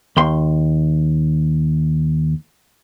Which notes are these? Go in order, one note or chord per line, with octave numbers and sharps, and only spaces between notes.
D#2 C6